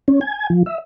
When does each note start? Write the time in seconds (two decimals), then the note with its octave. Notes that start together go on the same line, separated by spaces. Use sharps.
0.08 C#4
0.21 G#5
0.50 F3
0.66 E5